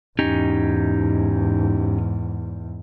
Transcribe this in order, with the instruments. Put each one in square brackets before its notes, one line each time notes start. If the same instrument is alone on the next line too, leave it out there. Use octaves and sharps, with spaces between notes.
[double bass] E2 G#2 [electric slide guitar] C#4 D#4 G4